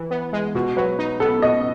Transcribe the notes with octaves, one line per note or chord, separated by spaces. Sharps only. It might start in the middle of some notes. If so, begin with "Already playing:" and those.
Already playing: E3
B3
G#3
B2 F#4
F#3 B4
D#4
B3 A4
B2 D#5